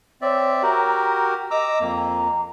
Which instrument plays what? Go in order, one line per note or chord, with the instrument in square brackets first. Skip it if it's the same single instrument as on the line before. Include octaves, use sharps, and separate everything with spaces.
[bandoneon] C4 D5 E5 [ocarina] C#5
[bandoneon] F#4 G4 A#4 [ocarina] A#5
[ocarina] D#5 [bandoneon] A#5 D6 E6
[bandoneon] F2 A#3 [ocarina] A#5